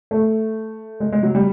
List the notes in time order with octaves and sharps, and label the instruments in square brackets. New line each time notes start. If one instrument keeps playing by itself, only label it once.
[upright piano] A3
G#3
G#3
F#3
G3